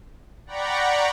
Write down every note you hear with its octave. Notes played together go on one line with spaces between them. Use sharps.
D5 F#5 G5 A#5 B5 C#6